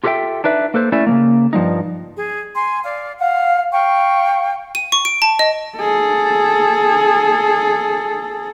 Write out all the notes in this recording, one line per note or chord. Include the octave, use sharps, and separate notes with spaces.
F4 G4 A4 A#4 E5 G5
D4 D#4 B4 E5
A#3 A4 B4 C5
A3 C#4 E4 D5 E5
C#3 E3 A#3
G2 F3 G3 D#4
G#4
G#5 C6
D5 F5
F5 F#5
F5 G5 C#6
D#7
C#6
D7
A5
D#5
G#4 A4